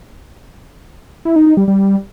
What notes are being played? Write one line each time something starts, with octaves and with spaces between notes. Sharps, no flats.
E4
D#4
D#4
G3
G3